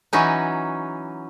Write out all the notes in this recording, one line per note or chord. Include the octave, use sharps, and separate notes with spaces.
E3 F#3 C#4 D#4